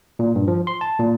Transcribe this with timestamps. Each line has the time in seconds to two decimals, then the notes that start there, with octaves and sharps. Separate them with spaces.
0.19 A#2
0.35 G2
0.48 F3
0.67 C6
0.81 A5
0.99 A#2